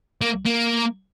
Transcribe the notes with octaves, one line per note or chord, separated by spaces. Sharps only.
A#3
A#3